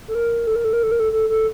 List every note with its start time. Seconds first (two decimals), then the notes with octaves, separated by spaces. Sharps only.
0.08 A4
0.15 A#4
0.47 A4
0.56 A#4
0.65 A4
0.73 A#4
0.83 A4
0.92 A#4
1.00 A4
1.12 A4
1.29 A4